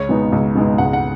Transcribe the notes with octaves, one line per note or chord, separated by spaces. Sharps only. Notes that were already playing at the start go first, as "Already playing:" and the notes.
Already playing: C#2 C#5
B2 G#3 B3 D#4
C#2
B2 G#3 B3 D#4
C#2 F#5
F#5